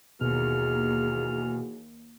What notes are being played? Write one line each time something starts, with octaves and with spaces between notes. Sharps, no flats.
D#2 B2 E3 F#4 G#4 F6